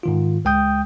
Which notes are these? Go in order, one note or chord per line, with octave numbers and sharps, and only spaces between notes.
G#2 D#3 F4
C#2 G#3 G5 D#6 G6